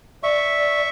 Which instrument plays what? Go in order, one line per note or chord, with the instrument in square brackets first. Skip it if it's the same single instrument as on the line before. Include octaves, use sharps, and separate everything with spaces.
[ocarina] D5 [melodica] E5 C#6